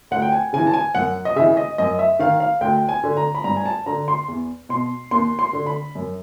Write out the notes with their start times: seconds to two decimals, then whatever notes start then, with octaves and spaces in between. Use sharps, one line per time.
0.11 D2 F#5
0.22 G5
0.32 G#5
0.53 C#3 E3 G#5
0.67 A5
0.74 G#5
0.95 F#2 F#5
1.25 D#5
1.36 C#3 E3 E5
1.57 D#5
1.78 F#2 D#5
1.99 E5
2.19 D#3 F5
2.40 F5
2.61 D2 G5
2.89 G#5
3.04 D3
3.17 A#5
3.35 B5
3.44 G2 A#5
3.56 G#5
3.66 A5
3.86 D3 A#5
4.08 C6
4.28 E2
4.69 B2 C6
5.11 D#2 C6
5.39 C6
5.53 D3
5.66 B5
5.95 F#2